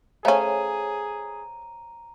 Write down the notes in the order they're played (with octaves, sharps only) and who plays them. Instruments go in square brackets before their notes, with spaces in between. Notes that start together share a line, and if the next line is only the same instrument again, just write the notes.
[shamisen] A3 C#4 [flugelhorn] G#4 [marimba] C5 C#5 F5 [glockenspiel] A#5 D#7